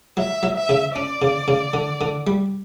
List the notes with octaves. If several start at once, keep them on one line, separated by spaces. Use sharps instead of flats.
F#3 E5
F#3
E5
C#3
C#4 D5
C#3
C#3
D3
D3
G3